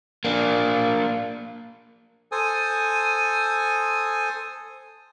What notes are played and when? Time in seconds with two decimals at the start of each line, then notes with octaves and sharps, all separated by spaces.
0.25 A#3 D4
2.32 A4 C5 G#5 D#6